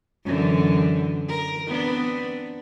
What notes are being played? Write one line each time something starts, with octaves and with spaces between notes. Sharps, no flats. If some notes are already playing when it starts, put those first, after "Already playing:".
F#2 D3 E3
A#4
B3 C4 D4